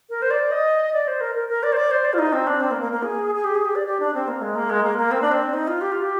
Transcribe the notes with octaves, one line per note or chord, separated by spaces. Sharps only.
A#4
C5
D5
D#5
D5
C5
A#4
A#4
A#4
D5
C5
D5
C5
D5
F4
D#4
C4
D4
C4
A#3
A#3
A#3
G#4
G#4
G4
G#4
G4
D5
G4
D4
C4
A#3
G#3
A#3
G#3
A#3
A#3
C4
D4
C4
D#4
F4
G4
F4
G4